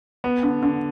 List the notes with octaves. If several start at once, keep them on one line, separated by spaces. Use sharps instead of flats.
B3
D3
D3